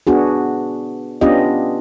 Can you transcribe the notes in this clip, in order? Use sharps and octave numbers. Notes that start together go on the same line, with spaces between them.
B3 D4 F#4 G#4
B3 C#4 D4 F4 G4 D#5